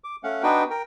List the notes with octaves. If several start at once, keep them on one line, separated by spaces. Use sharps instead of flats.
D6
A3 C#4 F5 F#5
B3 D4 D#4 F#4 B4 G5
A#4 G5